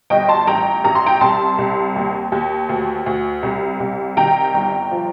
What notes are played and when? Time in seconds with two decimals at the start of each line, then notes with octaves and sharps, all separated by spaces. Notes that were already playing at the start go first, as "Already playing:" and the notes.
0.10 G1 D#5 G5
0.29 A5 C6
0.47 A1 G5 A#5
0.84 A1 A#5
0.95 C6
1.06 G5 A#5
1.21 C2 A5 C6
1.58 C2
1.96 D#2
2.32 D#2
2.69 D2
3.06 D2
3.43 C2
3.80 C2
4.17 D#3 G5 A#5
4.54 G1
4.91 F3